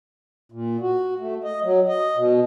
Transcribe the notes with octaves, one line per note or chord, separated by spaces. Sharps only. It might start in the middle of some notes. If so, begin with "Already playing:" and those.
A#2
F#4
A3
D#5
F#3
D#5
B2